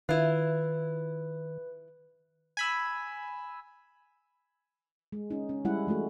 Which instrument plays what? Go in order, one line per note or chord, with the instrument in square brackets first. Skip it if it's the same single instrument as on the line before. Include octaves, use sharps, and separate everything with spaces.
[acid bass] D#3 [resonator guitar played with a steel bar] E4 F4 [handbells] B4
[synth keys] G#5 B5 E6
[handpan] G#3
C#4 D#4
C#4
G3 G#3 E4 F#5
E3 G#3 A3 F#4